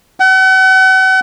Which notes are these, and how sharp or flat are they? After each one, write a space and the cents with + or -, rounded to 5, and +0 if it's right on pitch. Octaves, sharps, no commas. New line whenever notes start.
F#5 +40